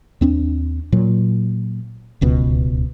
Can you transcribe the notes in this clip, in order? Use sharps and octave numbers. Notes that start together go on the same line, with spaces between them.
D#2 C4 D4
A#2 F#3
D1 C#2 B2